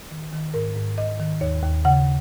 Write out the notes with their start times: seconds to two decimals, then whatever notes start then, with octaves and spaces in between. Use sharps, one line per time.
0.11 D#3
0.33 D#3
0.54 G#2 A#4
0.75 G#2
0.98 G#2 D#5
1.19 D#3
1.41 D#2 C#5
1.63 D#2
1.85 C#3 F#5